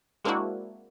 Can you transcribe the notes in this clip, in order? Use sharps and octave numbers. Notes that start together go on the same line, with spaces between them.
G#3 A#3 C4 D4 E4 F#4